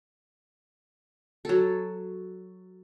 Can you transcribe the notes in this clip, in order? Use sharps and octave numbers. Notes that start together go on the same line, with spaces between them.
F#3 A4